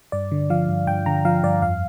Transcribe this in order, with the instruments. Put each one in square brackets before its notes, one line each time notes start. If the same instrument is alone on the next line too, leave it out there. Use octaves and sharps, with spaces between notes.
[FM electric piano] G2 D5
D3
F3 F5
G2
G2 G5
D3 A#5
F3 F5
G2 D5
F2 F5